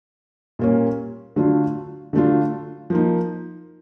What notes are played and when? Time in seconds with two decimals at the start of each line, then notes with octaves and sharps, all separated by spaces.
0.59 A#2 G3 A#3 C#4
1.36 D3 F#3 A3 D4 F4
2.13 D3 F#3 A3 D4 F4
2.90 F3 A#3 D#4